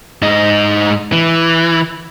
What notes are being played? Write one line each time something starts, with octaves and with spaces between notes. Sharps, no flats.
G#2 D#4
E3